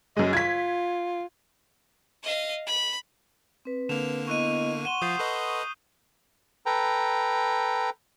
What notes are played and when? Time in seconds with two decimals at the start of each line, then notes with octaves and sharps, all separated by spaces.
0.17 F#2 G#3 D#5
0.33 F4 G#6 B6
2.24 D#5 F5
2.67 B5
3.65 C4 B4
3.89 D3 A#3 E7 F7
4.27 B3 E4 D#5 C#6 F#6 D#7
4.85 F#5 C6 C#6 D#7 E7 G7
5.01 F3 F4 D#6 G6 C7
5.19 A4 B4 D#5
6.66 A4 B4 G5 A#5